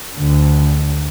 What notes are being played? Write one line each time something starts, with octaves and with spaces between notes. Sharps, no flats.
D2 D3